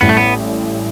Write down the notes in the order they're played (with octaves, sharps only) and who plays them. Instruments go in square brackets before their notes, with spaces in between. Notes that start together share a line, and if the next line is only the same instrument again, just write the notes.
[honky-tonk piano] A1 A2 G3 [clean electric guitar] B3
[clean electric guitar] A3
B3